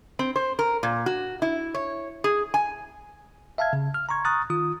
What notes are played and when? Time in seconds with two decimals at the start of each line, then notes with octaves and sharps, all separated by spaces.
0.19 C4
0.36 C5
0.59 A#4
0.83 A#2
1.06 F#4
1.42 E4
1.75 C#5
2.24 G#4
2.54 G#5
3.58 E5 F5 A5 F6 G#6
3.73 C#3
3.94 F6
4.09 A#5 C6 C#6 G#6
4.25 A#5 C#6 D#6 F6 F#6 A6
4.50 D#3 F4 D#6